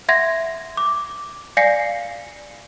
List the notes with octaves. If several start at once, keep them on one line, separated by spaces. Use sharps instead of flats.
E5 F#5 C6 G#6 A#6
D6
D5 F5 G#5 A#6 C7 C#7